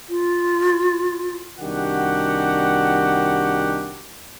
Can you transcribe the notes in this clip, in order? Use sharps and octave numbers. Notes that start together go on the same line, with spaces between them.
F4
C2 D#3 D4 F#4 G4 F#5